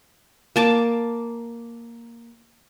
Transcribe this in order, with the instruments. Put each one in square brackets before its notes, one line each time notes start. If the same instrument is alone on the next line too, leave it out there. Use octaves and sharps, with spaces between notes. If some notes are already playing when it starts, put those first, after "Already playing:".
[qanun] A#3 A5 D6